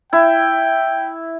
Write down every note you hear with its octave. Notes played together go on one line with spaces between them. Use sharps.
E4 G5